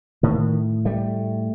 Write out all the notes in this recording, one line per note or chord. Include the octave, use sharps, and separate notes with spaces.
A2 D#3
G3 A3